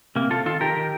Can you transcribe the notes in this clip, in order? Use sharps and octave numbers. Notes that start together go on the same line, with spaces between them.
C3 A#3
C3 F4 A4
D#3 F4 A4
D#3 G4 A#4
D#3